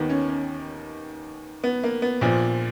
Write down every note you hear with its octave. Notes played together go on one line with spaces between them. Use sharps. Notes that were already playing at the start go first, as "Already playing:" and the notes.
Already playing: D#2 D#3 B3
C#4
C#4
B3
A#3
B3
A#1 A#2 F3